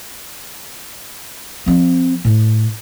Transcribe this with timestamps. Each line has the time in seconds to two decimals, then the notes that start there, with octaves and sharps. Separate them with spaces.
1.66 F3 C4
2.25 A2